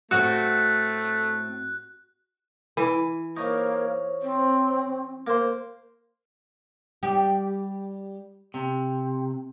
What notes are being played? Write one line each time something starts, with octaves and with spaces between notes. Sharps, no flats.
A2 A3 C4 F#4 F#6
E3
A#3 D#4 C5 C#5 C#6
C4
A#3 C5
G3 G4
C3